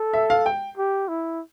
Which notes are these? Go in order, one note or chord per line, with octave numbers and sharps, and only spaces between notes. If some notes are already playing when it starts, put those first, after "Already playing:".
Already playing: A4
E5
F5
G5
G4
E4